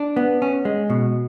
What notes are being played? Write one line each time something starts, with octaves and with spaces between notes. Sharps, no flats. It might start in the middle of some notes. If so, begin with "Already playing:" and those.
Already playing: D4
B3
C#4
G#3
B2